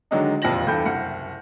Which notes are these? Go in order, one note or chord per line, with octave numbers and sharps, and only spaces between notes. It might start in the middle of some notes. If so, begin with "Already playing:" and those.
D3 D#3 F#3 G#3 D4 D#4
E1 F2 A#2 G4 A#6 F#7
E2 G2 A4 G5 B5 G6
F#1 C2 F#5 C#7